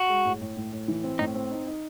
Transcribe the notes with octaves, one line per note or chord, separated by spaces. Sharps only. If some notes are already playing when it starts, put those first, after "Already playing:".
Already playing: F#4
G#3
A2
A2
A2
A2
E3
C4
A2 D#4
C4
D#4
D#4